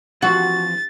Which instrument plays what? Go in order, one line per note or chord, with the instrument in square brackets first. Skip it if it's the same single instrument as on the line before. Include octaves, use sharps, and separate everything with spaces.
[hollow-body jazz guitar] F2 E3 F3 [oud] F#4 [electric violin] A6